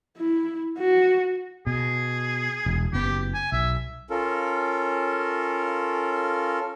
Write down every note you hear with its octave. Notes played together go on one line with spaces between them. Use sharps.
E4
F#4
B2 G#4
E1
F#1 B3 G4
G#5
B1 E5
C#4 F4 A4 A#4